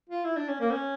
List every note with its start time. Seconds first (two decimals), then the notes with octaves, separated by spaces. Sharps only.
0.09 F4
0.24 E4
0.36 D4
0.49 C#4
0.60 A#3
0.71 C#4